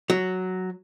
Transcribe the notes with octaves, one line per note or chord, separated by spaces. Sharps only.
F#3